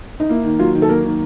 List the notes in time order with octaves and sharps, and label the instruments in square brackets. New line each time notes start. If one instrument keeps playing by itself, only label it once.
[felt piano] D#4
[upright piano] A#3 [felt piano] E4
[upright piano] D#3
[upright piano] F#3 [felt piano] F4
[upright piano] D#3
[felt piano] A4
[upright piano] A#3 [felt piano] A#4
[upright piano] D#3